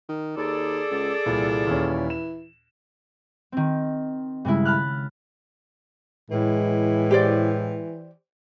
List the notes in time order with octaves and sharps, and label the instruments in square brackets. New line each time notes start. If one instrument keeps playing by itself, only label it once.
[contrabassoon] D#3
[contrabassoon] D#2 [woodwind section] G#4 A4 D5
[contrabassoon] C#2
[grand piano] C2 A#2 [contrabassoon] E3
[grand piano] D#2 A#2 C#4
E7
[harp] D#3 C4
G2 C#3 G#3 E4
A5 B5 F6 F#6
[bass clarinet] A2 [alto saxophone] E3 [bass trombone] G#3
[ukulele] G4 C5 D5